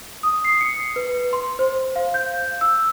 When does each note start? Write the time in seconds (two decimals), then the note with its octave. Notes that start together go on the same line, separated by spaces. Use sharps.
0.23 D#6
0.44 C7
0.61 C#7
0.96 B4
1.33 C6
1.59 C5
1.96 F5
2.14 G6
2.61 E6